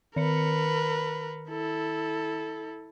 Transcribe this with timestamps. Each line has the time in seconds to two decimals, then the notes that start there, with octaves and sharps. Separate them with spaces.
0.16 D#3 A#4 B4 C#7
1.50 E4 A4